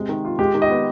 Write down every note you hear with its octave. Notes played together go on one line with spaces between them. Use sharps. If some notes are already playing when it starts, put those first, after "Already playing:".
Already playing: C3 G#3
D#3
F4
G#3 G4
D#3
D#5
B3